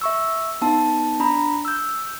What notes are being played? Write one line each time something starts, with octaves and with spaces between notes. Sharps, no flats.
E5 C#6 E6
B3 D#4 A5
D4 A#5 B5
E6 G6